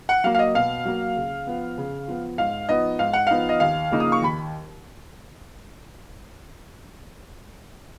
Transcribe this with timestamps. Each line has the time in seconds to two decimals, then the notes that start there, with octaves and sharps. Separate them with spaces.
0.09 F#5
0.24 F#3 A#3 F5
0.35 F5
0.39 D#5
0.54 B2 F5
0.85 F#3 A#3
1.16 C#3
1.47 F3 B3
1.78 C#3
2.08 F3 B3
2.38 G#2 F5
2.69 F3 B3 D#4 D#5
2.99 G#2 F5
3.13 F#5
3.27 F3 B3 D#4 F5
3.49 D#5
3.60 D#2 F5
3.91 C#3 F3 A#3 D#4
4.00 D#6
4.12 C#6
4.22 D#2 B5